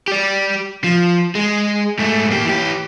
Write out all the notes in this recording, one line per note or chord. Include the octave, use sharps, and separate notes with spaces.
G4 D5
F3
G#3
G#2 A3
A#3 G4
E3 G4